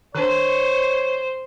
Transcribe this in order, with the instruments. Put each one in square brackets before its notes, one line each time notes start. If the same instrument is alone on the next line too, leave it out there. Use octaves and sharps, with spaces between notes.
[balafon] D#3 D4 [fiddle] C5 [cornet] C#5